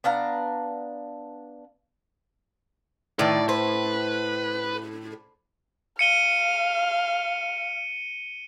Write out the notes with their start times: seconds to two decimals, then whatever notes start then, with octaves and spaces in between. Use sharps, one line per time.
0.04 B3 D4 F5 A#5
3.19 A2 D#3 B4 D5
3.49 B4 C5
5.99 F5 C#7 D#7 G7